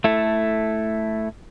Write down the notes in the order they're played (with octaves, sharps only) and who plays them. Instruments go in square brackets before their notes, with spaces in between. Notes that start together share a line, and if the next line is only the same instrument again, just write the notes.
[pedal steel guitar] A3 E4 A4